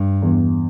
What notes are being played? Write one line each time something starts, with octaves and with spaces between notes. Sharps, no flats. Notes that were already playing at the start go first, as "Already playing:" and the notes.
Already playing: G2
E2